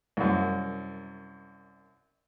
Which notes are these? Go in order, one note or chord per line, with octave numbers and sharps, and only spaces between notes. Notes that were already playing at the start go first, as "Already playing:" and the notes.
C2 F#2